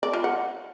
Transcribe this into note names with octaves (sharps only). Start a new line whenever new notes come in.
D5
F4
F#5